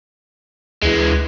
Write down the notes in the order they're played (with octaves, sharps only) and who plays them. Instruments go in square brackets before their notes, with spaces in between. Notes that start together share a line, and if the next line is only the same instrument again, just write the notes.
[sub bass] D2 [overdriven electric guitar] E3 G#3